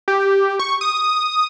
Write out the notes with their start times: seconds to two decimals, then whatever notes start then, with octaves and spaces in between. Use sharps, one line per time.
0.08 G4
0.59 C#6
0.81 D#6